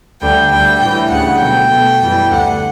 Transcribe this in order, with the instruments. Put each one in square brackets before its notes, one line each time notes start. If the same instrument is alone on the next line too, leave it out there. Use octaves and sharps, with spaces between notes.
[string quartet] D2 D3 G3 G5
D2 D3 G3 G5
A2 E3 G3 G5
D2 C#3 G3 F#5
B2 F#3 A3 G5
B2 A3
F#2 E3 G3
D2 D3 A3 F#5